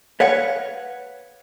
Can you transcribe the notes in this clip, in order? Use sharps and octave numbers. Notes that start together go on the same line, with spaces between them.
B4 C#5 F5 F#5